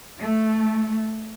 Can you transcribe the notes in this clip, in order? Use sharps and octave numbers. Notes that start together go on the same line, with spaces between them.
A3